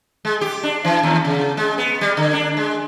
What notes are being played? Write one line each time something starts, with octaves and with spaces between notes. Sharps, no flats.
G#3
G4
D4
E3
D#2
C#3
G#3
B3
G3
D3
D4
G#3